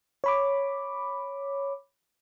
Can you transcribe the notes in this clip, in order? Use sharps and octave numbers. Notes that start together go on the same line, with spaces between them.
C#5 B5 D6